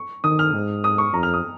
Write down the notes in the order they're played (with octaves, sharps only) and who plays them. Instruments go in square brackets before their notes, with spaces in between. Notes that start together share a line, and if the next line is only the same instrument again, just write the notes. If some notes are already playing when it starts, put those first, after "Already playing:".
Already playing: [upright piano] C#6
[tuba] D#3 [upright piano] D#6
[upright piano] F6
[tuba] G#2
[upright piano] D#6
C#6
[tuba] F2 [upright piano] A#5
[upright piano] F6
D#6